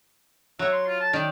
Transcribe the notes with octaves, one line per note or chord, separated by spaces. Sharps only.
F#3 C#5 E5
C6
F4
A5
D#3 D5 G5